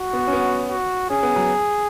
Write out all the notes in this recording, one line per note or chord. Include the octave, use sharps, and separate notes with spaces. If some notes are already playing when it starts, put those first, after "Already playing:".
Already playing: F#4
B3
C#4
B3
F#4
C#4 G#4
B3
F#3